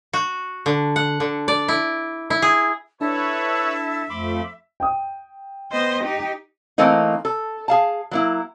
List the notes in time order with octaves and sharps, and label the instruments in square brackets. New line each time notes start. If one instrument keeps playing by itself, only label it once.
[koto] F#4
D3
F#5
D3
D5
E4
E4
G#4
[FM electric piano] D4 [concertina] E4 A4 A5 [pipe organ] B4 C#5 [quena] E5
[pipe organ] F2 F3 A3 [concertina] B5 C6 D6
[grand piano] G5 D#6
[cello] B3 [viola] C5 D#5
[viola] D#4 [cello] G4
[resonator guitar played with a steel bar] E3 A3 A#3 C4 D#4
A4
G#4 F5 A5
F#3 A#3 E4